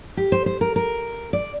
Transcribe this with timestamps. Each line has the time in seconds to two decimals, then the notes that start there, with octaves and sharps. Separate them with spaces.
0.17 G4
0.32 C5
0.46 C5
0.61 A#4
0.76 A#4
1.33 D5